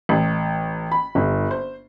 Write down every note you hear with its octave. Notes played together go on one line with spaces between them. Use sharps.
A1
B5
G1
C5